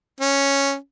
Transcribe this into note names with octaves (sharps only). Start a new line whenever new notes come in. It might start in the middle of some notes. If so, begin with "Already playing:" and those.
C#4